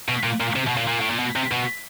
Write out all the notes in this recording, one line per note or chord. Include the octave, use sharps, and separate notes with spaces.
B2
A#2
A#2
C3
B2
A#2
A#2
A2
A#2
B2
C3
B2